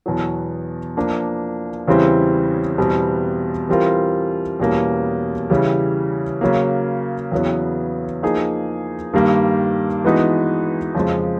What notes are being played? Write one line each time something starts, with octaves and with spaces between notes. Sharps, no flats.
E2 B2 F#3
F3 A#3 D4
E2 C#3 E3 G3 C4
E2 B2 G3 C4
E3 G3 C4 F4 A#4
E2 B2 G3 A#3 C#4
C#3 E3 G3
C#3 F#3 A#3
E2 C#3 F#3 B3
F3 A#3 D#4 G#4
G2 D#3 G3 A#3
E3 G#3 B3 D#4 F#4
F2 C#3 F3 G#3